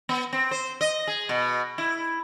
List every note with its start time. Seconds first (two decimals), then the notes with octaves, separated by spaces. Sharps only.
0.09 B3
0.33 C4
0.51 C5
0.81 D#5
1.07 G#4
1.29 B2
1.78 E4